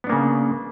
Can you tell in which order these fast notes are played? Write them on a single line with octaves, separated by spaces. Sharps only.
B3 D4 A#3 C#3